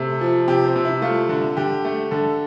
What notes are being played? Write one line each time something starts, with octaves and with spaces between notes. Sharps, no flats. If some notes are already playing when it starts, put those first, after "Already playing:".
Already playing: C3 A3
F3
C3 G4
C4
C3
E4
A3 F4
D3
D3 G4
A3
D3 A4